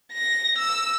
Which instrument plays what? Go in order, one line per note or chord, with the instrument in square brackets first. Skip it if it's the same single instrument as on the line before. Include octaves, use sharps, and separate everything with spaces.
[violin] A#6
E6